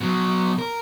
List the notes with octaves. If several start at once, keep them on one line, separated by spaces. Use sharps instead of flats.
B2 F#3
A#4